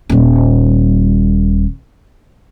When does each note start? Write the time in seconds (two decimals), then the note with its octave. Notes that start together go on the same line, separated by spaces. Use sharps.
0.09 D#1 G3